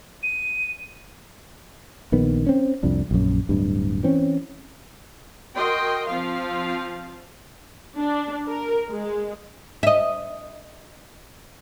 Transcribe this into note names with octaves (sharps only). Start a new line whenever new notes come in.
D#7
A#1 D#3 B3
C4 C#4
C2 F2 D4
A#1 F#2
D1 G2
E3 C4 C#4
F#4 A#4 D#5 G5 C6
F3 C4 F4 F5
D4
A#4
G#3
D#5 E5